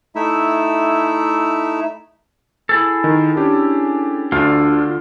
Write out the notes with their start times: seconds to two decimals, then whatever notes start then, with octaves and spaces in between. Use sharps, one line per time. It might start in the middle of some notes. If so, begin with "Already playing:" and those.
0.16 A3 D#4 E4 E5
2.69 E4 G#4 A4
3.04 D#3
3.37 C#4 D4 G4
4.32 D2 D3 D4 F4